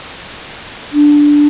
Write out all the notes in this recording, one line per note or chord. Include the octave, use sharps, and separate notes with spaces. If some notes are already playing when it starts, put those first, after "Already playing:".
D4